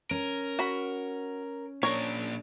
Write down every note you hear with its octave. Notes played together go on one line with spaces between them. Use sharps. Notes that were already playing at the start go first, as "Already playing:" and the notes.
C#4 A#4
F#4 B5
A#2 D4 A#4 C#5